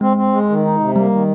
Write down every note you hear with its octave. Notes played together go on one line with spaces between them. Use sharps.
G#3 C4
C4
G#3
D#3
D#4
C3
G3 A#3
D#3